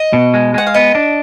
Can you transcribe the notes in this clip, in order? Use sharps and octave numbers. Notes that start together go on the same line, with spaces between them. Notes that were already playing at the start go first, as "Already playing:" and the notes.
Already playing: D#5
B2
G#3
G#3 F#5
F5
B3 D#5
D4